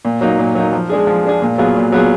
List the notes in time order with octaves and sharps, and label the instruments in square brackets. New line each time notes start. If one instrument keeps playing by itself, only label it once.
[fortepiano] A#2
F#3 A#3 D#4
A#2
F#3 A#3 D#4
F3
G#3 D4 G#4
F3
G#3 D4 G#4
A#2
F#3 B3 F4 G#4
A#2
F#3 B3 F4 G#4